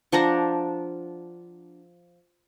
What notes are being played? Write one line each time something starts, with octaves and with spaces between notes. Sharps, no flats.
F3 D4 F#5 A#5